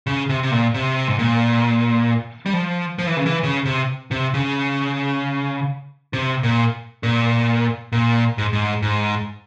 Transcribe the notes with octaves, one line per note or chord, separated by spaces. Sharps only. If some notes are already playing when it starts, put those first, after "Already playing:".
C#3
C3
C3
A#2
C3
G#2
A#2
G3
F3
F3
E3
C#3
E3
C#3
C3
C3
C#3
C3
A#2
A#2
A#2
G#2
G#2
G#2